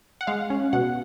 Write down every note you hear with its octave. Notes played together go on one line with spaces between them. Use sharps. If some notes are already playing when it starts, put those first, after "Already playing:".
F#5
G#3 F5
C#4
B2 F#5